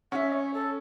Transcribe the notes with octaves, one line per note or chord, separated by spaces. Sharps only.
C#4 E5 F#5
C#5
A4